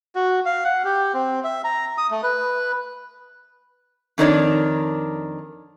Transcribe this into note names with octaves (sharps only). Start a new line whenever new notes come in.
F#4
F5
F#5
G4
C4
E5
A#5
D#6
A3
B4
F2 D#3 D4 C#5 D5